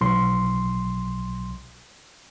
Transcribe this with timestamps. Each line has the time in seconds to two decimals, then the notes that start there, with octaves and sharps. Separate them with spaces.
0.01 B1 C6